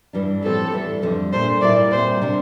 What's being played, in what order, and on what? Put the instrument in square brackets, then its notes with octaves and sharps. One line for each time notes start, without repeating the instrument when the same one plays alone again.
[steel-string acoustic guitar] G2 E3 G3 D4
[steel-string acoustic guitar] A2 F3 C4 G4 [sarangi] A4
[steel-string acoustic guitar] E2 E3 G3 D4 A4
F2 D3 G3
[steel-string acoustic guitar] A#2 A3 D4 [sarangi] C5
[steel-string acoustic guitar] A#2 G3 A#3 E4 [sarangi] D5
[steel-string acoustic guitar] A#2 G3 C4 [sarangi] C5
[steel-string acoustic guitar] C3 G3 D4